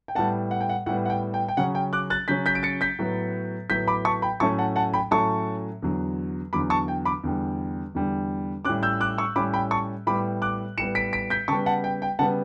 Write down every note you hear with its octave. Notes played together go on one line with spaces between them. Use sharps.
G5
A2 G3 B3 F#5 A5
F#5
G5
F#5
A2 G3 B3 F#5
F#5
G5
G5
G5
C#3 F#3 C#4 F#5
G5
D6 F#6
F#6 A6
C#3 F#3 C#4 G6 B6
G6 B6
D7
A6 C#7
G6 B6
A2 F#3 B3
A2 F#3 B3 G6 B6
B5 D6
A5 C#6
G5 B5
A2 F#3 A3 C#4 A5 C#6
F#5 A5
F#5 A5
G5 B5
A2 F#3 A3 C#4 A5 C#6
E2 D3 F#3
E2 D3 F#3 B5 D6
A5 C#6
G5
B5 D6
E2 D3 G3
E2 D3 G3
A2 G3 C#4 D6 F#6
E6 G6
D6 F#6
C#6 E6
A2 G3 C#4 B5 D6
G5 B5
A5 C#6
A2 G3 B3 B5 D6
D6 F#6
A2 G3 B3 C#7 E7
B6 D7
B6 D7
G6 B6
C#3 G3 B3 A5 C#6
F#5 A5
G5
G5
C#3 G3 B3 F#5 A5